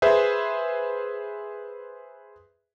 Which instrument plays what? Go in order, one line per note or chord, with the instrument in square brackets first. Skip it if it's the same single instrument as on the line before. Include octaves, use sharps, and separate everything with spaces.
[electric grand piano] G#4 B4 C5 E5